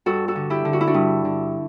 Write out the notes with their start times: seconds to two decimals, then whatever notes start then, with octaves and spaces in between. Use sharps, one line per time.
0.06 G2 F#4 A4
0.28 F#4 A4
0.36 D3
0.50 E4 G4
0.65 D3
0.73 F#4
0.81 E4
0.87 D4 F#4
0.94 G2
1.25 D3